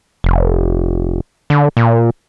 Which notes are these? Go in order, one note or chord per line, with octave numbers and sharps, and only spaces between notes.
F1
D3
A#2